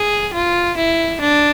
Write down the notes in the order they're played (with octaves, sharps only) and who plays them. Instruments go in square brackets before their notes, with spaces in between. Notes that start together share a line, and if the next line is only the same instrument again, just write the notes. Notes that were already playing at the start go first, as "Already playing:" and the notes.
Already playing: [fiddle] G#4
F4
E4
D4